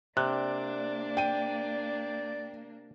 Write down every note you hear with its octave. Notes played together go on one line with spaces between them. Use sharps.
C3 A#3 D4 D5 F#6
G5 D#7